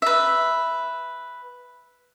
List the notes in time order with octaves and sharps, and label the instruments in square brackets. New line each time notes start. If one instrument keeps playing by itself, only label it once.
[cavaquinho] B4 E5